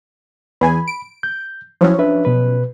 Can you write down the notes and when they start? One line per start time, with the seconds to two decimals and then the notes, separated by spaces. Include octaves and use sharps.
0.61 E2 G#4 G#5 B5
0.88 D7
1.23 G6
1.81 F3 F#3 C#4 E4
1.99 D4 B4 E5
2.25 B2 B4